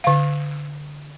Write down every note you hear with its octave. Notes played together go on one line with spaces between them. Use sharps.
D3 F5